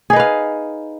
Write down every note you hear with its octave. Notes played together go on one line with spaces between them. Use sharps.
D#4 G#4 B4 F5